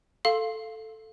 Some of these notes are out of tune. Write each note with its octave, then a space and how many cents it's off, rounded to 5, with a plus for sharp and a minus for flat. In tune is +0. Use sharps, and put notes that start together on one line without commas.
A4 +0 F5 +0 C6 +20